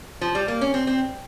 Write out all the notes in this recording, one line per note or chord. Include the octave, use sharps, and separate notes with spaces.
F3
G3
A#3
C#4
C4
C4